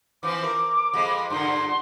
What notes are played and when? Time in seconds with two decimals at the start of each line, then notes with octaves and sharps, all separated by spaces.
0.23 E3 F3 C4 D6
0.43 A#4
0.94 F2 G#3
1.30 G2 A#2 D3 C6